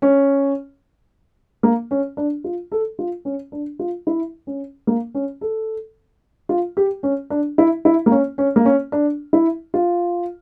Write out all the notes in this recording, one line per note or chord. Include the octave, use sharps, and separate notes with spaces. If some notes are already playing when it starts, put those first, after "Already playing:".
C#4
A#3
C#4
D4
F4
A4
F4
C#4
D4
F4
E4
C#4
A#3
C#4
A4
F4
G4
C#4
D4
E4
E4
A#3
C#4
C#4
A#3
C#4
D4
E4
F4